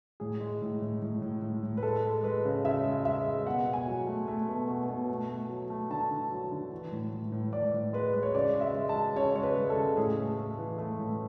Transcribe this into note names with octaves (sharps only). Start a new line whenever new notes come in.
A2 G#4
G#3
A2
A2
A2
A2
A2
A2
B4
G#3 A4
G#3
G#3 B4
C#3
C#3 E5
G#3
G#3 E5
G#3
B2 F#5
B2
G#5
F#3
A3
A3
B2
B2
B2
A3
A3
F#3
A3
D3 A5
D3
F#3
D3
E3
A2
A2
A2
A2 D5
A2
G#3 B4
G#3
C#5
C#3 D5
G#3
E5
G#3
A5
G#3
C#3 C#5
G#3 C#5
B4
G#3
A4
C#3
A2 G#4
A3
A3
E3
A3
A2